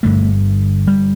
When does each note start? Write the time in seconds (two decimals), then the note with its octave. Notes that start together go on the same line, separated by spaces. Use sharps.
0.03 G1 G2 D3 A3
0.88 G3